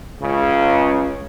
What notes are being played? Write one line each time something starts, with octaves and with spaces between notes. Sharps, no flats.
C#2 C#3